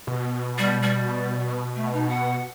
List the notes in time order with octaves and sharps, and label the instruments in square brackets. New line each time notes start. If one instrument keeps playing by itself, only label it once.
[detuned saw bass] B2
[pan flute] G3
G3
A3
D#4
F#5